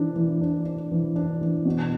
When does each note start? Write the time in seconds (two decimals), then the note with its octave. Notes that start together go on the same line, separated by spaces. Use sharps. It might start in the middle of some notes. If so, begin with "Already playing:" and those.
Already playing: E3 D4
0.16 E3
0.41 D4
0.65 D4
0.91 E3
1.16 D4
1.41 E3
1.65 B2